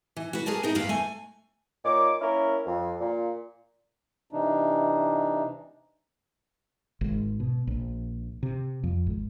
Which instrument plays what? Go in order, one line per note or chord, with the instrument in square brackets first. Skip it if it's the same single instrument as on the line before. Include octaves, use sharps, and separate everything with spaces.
[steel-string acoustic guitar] E3
F#4 B4
G#4 A#4 C#5 D5 A5
B3 D#4 E4 A#4
E2 G2 A#3 B4 F5
A3 G#5
[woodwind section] A#2 D#4 C#5 D6
A#3 C#4 E4 A#4 C#5
F2
A#2
[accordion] C3 E3 D4 D#4
[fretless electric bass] G#1
B2
A#1
C3
F2
G#1